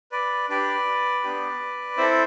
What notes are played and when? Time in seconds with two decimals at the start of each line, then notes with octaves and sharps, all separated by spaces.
0.12 B4 D5
0.49 D4 G4 B4 D5
1.23 B3 D4 G4
1.97 C4 E4 A4 C5 E5